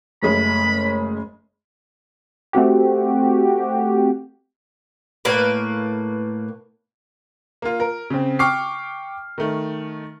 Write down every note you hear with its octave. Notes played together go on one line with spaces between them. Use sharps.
F#1 G#3 A3 C#4 G#4 B5
A3 C4 F#4 G4
A2 A#3 B4
A#3 F4
A#4
C#3 C4
G5 C#6 D6 F6 C7
D#3 A3